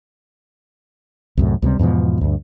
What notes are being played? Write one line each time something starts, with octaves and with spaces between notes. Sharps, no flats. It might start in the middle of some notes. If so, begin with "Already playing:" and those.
C2 F#2 A2
C#2 C3 G3
E2 G#2 B2 F3
D2 G2